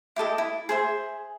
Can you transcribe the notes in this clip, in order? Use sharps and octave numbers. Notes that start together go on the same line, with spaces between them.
E4 G4 A4 D#5
E4
G#4 C5 E5